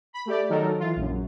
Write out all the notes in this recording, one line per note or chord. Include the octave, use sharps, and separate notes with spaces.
B5
A3 G4 D5
D#3 F#3 D#4 A4 A#4
E3 F4
A#1 F#2